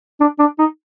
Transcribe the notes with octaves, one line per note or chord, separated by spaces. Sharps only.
D4
D4
D#4